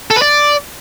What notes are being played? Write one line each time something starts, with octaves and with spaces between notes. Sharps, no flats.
A4
B4
D5